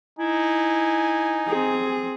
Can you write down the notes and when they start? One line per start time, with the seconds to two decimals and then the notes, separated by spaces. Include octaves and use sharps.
0.19 D#4 E4 G#5
1.47 C4 G#4